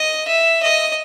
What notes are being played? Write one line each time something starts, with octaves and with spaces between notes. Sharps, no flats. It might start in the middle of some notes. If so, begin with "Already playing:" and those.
Already playing: D#5
E5
D#5